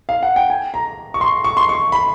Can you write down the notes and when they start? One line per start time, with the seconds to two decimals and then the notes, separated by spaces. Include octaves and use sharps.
0.09 F5
0.23 F#5
0.36 G5
0.50 G#5
0.74 A#5
1.14 C#6
1.21 C6
1.44 C#6
1.57 C6
1.69 C#6
1.92 B5